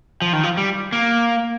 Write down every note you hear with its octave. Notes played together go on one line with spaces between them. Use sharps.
F3
D#3
F3
G3
A#3